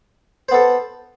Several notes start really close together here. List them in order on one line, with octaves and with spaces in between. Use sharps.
C5 B3 A4